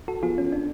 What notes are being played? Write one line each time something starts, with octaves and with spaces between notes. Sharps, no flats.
F#4 A4
F3 B3 F4 G#4
C#4
D4